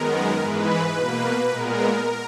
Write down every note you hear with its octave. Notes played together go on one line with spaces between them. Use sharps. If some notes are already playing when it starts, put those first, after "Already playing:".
Already playing: F#2 D#3 G#3 B3 A#4
G#2 E3 G#3 B4
B2 A#3
A#2 G#3 B3 A#4